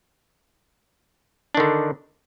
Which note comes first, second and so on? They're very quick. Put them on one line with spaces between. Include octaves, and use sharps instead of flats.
D4 D#3 D3